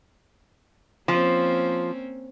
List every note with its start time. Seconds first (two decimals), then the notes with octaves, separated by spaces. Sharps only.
1.08 F3 A#3 C4 C#4